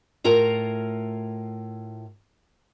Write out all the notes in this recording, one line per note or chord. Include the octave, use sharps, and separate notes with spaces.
A2 F4 A#4 A#5